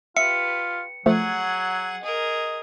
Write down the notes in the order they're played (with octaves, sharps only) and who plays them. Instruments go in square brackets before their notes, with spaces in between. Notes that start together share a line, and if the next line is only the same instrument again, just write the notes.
[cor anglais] F4 [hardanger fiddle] G4 B4 [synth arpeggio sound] E5 [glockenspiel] C#7
[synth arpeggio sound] F3 A3 [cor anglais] F#3 [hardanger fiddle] G#4 F#5
[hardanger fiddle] G#4 A#4 [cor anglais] D#5